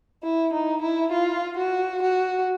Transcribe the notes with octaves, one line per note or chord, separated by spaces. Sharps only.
E4
D#4
E4
F4
F#4
F#4